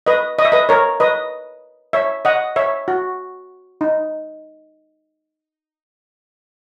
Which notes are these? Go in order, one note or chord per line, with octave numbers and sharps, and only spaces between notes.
B4 D#5
D#5
E5
B4 D#5
A#4 C#5
B4 D#5
C#5 E5
D#5 F#5
C#5 E5
F#4
D#4